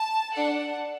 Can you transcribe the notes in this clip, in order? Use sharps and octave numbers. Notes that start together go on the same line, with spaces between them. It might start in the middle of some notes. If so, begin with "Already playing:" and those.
Already playing: A5
D4 A4 F#5